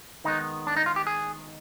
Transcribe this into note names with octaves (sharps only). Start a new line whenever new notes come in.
D#3 G#3 B3 D#4
D4
D#4
F4
G4
G#4